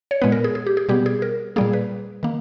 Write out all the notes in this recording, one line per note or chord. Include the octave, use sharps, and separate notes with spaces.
C#5
A#2 G#3 B3 B4
A#4
G#4
G#4
G4
G#4
B2 G3 B3 G4
G#4
A#4
A#2 G3 A#3 G#4
B4
D#3 A#3